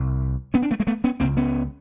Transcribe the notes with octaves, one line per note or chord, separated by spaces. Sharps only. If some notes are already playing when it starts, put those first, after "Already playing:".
Already playing: C2 C3
B3 C#4
C4 D4
A3 B3
G#3 A#3
A3 B3
B3 C#4
C#2 C#3 A#3 C4
B3 C#4